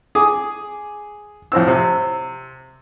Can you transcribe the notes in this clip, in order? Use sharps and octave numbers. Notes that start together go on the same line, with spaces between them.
G#4 D6 D#6
F2 A2 C4 E6
C3